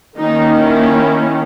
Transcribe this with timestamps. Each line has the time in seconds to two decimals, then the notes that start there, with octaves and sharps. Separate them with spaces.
0.17 D#3 A#3 C#4 D#4
0.57 E4